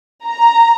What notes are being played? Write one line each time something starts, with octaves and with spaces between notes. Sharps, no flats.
A#5